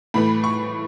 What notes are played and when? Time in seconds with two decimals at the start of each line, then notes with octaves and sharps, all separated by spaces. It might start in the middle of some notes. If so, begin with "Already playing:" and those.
0.14 A2 E3 A3 B5
0.44 C#6